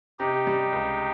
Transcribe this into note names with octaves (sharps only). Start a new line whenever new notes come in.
C3 D#4 G4
G3
C#2